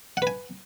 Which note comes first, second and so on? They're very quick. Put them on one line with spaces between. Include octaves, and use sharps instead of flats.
F#5 B4 G#5